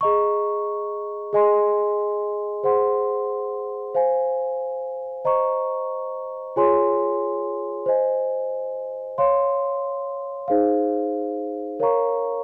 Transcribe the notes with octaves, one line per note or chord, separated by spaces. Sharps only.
G#4 D#5 A#5 C#6
G#4 D#5 G#5 C6
G#4 C5 F#5 C6
C5 F5 G#5
C5 D#5 A#5 C#6
F4 G#4 C#5 G#5 C6
C5 D#5 G#5
C#5 F5 C6
D#4 G#4 C5 F5
A#4 C#5 F5 A#5 C#6